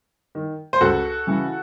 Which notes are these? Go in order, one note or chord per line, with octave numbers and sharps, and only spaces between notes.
D#3
C5
C#2 F#4 A4
C#3 E3